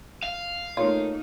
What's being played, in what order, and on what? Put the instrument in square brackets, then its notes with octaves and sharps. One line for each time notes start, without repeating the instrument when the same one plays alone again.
[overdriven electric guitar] F5
[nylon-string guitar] A3 A#4 C#5 [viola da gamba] A#3 D#4 [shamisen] F4